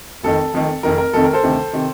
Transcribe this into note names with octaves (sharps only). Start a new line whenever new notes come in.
F1 F2 D#3 A4
F1 F2 D#3
F1 F2 D#3 A#4
A#4
F1 F2 D#3 A4
A#4
A4 C5
D2 C3 D#3
C3 D#3